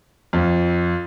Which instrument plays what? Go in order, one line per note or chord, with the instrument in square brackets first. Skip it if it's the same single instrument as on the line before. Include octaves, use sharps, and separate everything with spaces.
[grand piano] F2